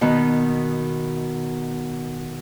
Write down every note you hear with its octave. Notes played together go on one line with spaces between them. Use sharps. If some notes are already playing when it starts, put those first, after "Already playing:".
B2 D#3 B3